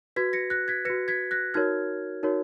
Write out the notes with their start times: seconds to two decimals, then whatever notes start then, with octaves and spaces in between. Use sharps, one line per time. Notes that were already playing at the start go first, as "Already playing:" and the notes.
0.16 F#4 B4 G#6 B6
0.33 A#6 C#7
0.50 F#6 A#6
0.68 G#6 B6
0.85 F#4 B4 A#6 C#7
1.08 G#6 B6
1.31 F#6 A#6
1.54 D#4 F#4 A#4 C#5 F6 G#6
2.23 D#4 F#4 A#4 C#5